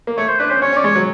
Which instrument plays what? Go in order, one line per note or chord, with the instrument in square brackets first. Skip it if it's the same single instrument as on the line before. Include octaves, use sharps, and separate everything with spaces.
[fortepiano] A#3
[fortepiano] A3 [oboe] C#5
[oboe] C5
[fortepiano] D4 [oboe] B4
[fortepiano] C#4 [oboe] C5
[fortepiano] C#4 [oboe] C#5
[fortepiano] C#4
[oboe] D5
[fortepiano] G#3 [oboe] C#5
[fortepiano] F#3